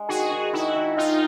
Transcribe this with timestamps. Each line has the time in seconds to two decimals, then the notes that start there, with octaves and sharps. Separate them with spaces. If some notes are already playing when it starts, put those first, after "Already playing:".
Already playing: G#3
0.09 D#3 F#4 G#4
0.31 D#3
0.53 D#3 E4 F#4
0.75 D#3
0.97 D#3 D#4 F4